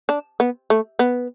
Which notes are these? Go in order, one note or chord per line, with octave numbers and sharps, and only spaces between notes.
D4
B3
A3
B3